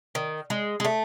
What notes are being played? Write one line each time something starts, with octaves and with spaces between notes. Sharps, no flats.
D#3
G#3
G#3
A3